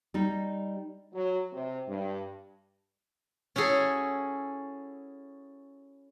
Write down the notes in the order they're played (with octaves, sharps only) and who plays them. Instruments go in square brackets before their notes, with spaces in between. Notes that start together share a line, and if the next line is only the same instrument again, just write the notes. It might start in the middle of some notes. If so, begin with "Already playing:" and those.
[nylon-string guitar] G3 D#4
[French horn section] F#3
C3
G2
[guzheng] C#4 E4 F#4 G#4 A4